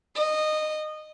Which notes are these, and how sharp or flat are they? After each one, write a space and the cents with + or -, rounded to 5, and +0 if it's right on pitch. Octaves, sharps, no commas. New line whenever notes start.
D#5 -15